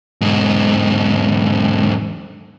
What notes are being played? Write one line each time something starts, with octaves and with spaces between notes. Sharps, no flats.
E2 G#2